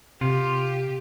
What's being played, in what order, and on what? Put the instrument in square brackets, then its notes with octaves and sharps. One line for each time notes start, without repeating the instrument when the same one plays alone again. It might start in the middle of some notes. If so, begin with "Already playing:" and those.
[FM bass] C3 [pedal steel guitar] F4 [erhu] G4